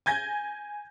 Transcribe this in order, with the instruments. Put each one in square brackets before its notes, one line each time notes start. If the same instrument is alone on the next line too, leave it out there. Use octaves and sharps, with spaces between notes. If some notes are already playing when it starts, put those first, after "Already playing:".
[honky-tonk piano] G#5 G6 G#6 A#6